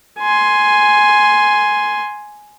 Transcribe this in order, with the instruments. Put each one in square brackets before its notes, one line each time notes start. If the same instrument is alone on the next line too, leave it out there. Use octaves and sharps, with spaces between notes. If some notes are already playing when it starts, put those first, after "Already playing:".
[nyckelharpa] G#5 C6